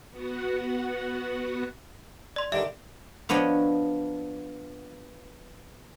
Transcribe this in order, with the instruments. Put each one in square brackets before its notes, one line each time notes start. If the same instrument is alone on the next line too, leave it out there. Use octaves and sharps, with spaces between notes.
[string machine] B3 F#4 F#5
[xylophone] D5 C6
[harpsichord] G2 D3 D#3 [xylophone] E5
[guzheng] F3 B3 D4 C#5 D#5